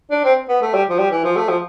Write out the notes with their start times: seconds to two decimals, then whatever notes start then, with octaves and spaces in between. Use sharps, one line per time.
0.11 D4
0.24 C4
0.49 B3
0.62 A3
0.74 G3
0.89 F3
0.98 G3
1.11 E3
1.24 F3
1.37 A3
1.49 F3